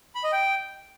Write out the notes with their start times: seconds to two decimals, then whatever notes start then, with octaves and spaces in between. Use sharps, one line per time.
0.15 B5
0.24 D#5
0.32 G5